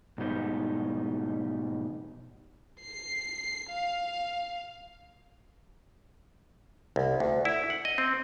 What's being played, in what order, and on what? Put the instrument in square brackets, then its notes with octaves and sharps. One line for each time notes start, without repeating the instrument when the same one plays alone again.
[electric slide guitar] G#2 B2 G3 D#4
[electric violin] C7
F5
[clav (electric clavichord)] C2
D2
E4
F#5
D#5
C4